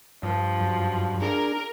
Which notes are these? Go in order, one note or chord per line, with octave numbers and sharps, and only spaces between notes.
G2 F3
F#2
D4 G#4 A#4